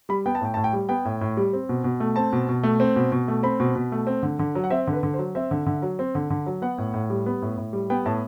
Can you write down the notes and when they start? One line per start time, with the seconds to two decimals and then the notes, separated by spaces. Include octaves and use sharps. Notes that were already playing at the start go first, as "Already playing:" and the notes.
0.09 G3 B5
0.26 B3 G5
0.35 A5
0.41 A2 G5
0.54 A2 A5
0.64 G5
0.73 G3
0.89 B3 G5
1.05 A2
1.21 A2
1.37 G3
1.53 C4
1.69 B2
1.84 B2
2.00 A3
2.16 C4 A5
2.33 B2
2.49 B2
2.63 A3
2.80 C4
2.96 B2
3.12 B2
3.28 A3
3.43 C4 B5
3.60 B2
3.75 B2
3.92 A3
4.07 C4
4.23 D3
4.39 D3
4.55 F#3
4.64 F#5
4.70 C4 E5
4.87 D3
4.93 B4
5.03 D3
5.14 C5
5.18 F#3
5.35 C4 E5
5.51 D3
5.67 D3
5.82 F#3
5.99 C4
6.15 D3
6.30 D3
6.47 F#3
6.62 B3 F#5
6.78 A2
6.94 A2
7.10 G3
7.26 B3
7.42 A2
7.57 A2
7.73 G3
7.90 B3 G5
8.05 A2 A5